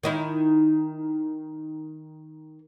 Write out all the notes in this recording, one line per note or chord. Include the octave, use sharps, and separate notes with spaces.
D#3 D#4 E4